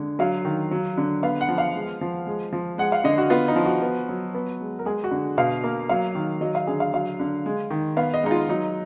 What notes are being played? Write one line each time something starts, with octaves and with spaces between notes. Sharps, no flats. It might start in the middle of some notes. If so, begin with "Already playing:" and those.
Already playing: D3 G#3
F#3 F5
D#3
F#3
D3
B3 F5
F#5
F3
F5
G#3
F3
G#3
F3
G#3 F#5
F5
D3 D#5
F#4
B3 F4
D#4
F3
F#4
B3
F#3
B3
G#3
A#4
G#3 G#4
F#4
D3
B2 F5
A#3
F#3 F5
D#3
F#3 D#5
F5
D3 G#4
F5
F#3 F5
D3
G#3
D#3
B3 F5
D#5
G#3 D#4
F4
F#3 D#4